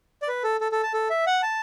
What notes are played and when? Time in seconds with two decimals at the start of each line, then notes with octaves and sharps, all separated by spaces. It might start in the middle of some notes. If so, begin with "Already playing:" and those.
0.22 D5
0.28 B4
0.44 A4
0.61 A4
0.72 A4
0.83 A5
0.94 A4
1.10 E5
1.27 F#5
1.43 A5